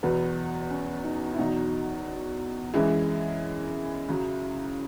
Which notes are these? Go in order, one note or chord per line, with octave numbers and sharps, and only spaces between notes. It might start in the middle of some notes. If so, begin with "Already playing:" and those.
E2 B2 F#3 B4
C#4
D#4
E4
E2 B2 F#3 D#4
F#2 E3 G#3 E4
C#2 C#3 F#3